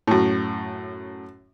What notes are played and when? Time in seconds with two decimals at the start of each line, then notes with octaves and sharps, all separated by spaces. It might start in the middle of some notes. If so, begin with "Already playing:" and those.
0.07 F#2 A2